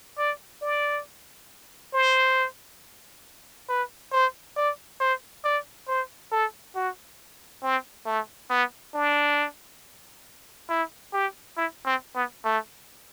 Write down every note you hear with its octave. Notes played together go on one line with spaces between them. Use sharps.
D5
D5
C5
B4
C5
D5
C5
D5
C5
A4
F#4
C4
A3
B3
D4
E4
G4
E4
C4
B3
A3